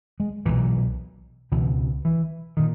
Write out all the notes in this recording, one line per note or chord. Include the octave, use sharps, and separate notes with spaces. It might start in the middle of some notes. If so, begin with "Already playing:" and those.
G#3
B1 A#2 E3
C#2 B2 E3
E3
A#2 D#3